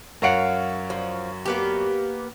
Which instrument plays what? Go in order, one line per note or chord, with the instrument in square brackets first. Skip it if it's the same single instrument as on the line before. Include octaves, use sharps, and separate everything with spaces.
[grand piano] F#2 C#5 D7 [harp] A#4 F5 F#5
[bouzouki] F3
A#3 B3 G4